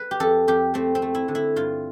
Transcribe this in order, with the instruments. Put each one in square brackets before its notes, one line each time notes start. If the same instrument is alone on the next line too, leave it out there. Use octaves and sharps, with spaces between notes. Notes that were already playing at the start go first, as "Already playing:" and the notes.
Already playing: [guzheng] B4
G4
F2 A4
F2 G4
A3 C4
C4
A3
E4
D3
E4
G2 F4